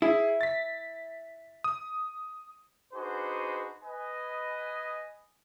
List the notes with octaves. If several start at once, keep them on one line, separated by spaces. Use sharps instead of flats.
E4 G#4
A6 B6
D#6
D4 D#4 F#4 G#4 B4 C5
B4 D#5 G#5